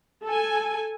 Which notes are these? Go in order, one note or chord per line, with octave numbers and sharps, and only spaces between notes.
A4 G#5